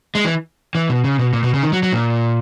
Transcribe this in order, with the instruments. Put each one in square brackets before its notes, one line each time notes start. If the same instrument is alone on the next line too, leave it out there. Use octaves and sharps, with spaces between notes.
[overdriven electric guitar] G#3
E3
E3
B2
C#3
B2
A#2
B2
C#3
D#3
F#3
F#3
A#2